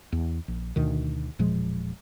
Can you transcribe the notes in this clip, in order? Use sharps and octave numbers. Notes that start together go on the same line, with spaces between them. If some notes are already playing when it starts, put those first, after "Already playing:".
E2
A#1
D2 B2 D#3
E1 A#2 F3 G#3